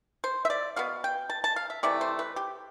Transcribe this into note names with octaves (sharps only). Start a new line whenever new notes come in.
C5
E5
D5
B2 B3 F5
G5
A5
A5
F5
E5
C3 E3 A3 D5
C5
B4
G4